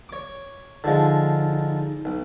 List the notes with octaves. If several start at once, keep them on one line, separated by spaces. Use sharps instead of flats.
C#5 D6
D3 F3 G#3 D#4
B1